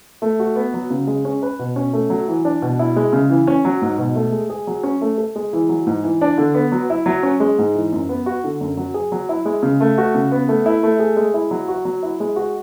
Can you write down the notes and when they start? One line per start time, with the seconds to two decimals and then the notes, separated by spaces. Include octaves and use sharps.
0.22 A3
0.39 F#4
0.56 B3
0.74 F#3
0.90 C#3
1.07 G#3
1.25 C#4
1.42 B4
1.59 B2
1.76 C#4
1.93 A3
2.10 F#3
2.28 E3
2.45 D4
2.62 B2
2.79 E4
2.96 G#3
3.13 C#3
3.30 E3
3.47 C#4
3.65 F#3
3.82 G#2
3.98 B2
4.15 A3
4.32 G#3
4.50 G#4
4.67 F#3
4.83 C#4
5.01 A3
5.18 A4
5.36 G#3
5.53 E3
5.69 F#3
5.87 G#2
6.04 E3
6.21 D4
6.38 D3
6.55 B3
6.72 F#3
6.90 E4
7.06 F#3
7.23 C#4
7.40 G#3
7.58 G#2
7.75 E3
7.92 F#2
8.09 B3
8.26 F#4
8.44 D3
8.61 F#2
8.77 F#3
8.94 G#4
9.12 F#3
9.29 E4
9.45 G#3
9.63 C#3
9.81 A3
9.98 F#4
10.14 C#3
10.32 B3
10.48 A3
10.66 E4
10.83 A3
10.99 G#4
11.16 G#3
11.34 E4
11.51 F#3
11.68 F#4
11.85 F#3
12.03 E4
12.20 G#3
12.36 F#4